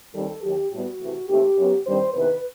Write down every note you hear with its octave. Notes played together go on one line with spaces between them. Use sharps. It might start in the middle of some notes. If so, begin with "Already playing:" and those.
D#2 D#3 G3 C4 A4
D#2 D#3 F#3 G4
A2 G3 B3 F#4
C3 E3 A3
D#2 D#3 A3 C4 G4
F#2 F#3 B3
G2 D#3 G3 C4 C5
E2 C3 D#3 B4